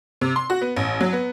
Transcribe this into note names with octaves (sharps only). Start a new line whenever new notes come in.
C3
C6
F#4
B3
A1
F#3
B3